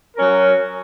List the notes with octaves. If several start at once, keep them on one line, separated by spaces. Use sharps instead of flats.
F#3 C#4 A#4